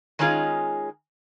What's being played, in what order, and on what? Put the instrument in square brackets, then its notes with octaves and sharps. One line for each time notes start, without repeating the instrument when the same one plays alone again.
[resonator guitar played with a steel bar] D#3 G#3 C#4 D#4 F4 G#4